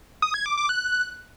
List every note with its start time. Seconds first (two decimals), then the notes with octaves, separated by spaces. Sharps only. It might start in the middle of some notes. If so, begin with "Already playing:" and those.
0.22 D#6
0.34 G#6
0.46 D6
0.57 D6
0.69 F#6